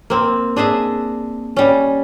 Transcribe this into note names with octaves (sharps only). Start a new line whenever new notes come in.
A#3 C4
D4 G#4 D#5 E5
G3 C#4